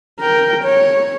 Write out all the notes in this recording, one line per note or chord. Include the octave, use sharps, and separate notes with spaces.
A#4 G5
C#5